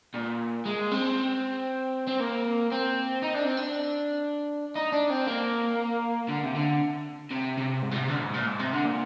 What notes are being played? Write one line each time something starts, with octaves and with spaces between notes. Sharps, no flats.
A#2
G#3
C4
C4
A#3
C4
D#4
D4
C4
D4
D#4
D4
C4
A#3
D3
C3
D3
C3
C3
G#2
A#2
C3
D3
G#2
A#2
G#2
C3
D3
A#2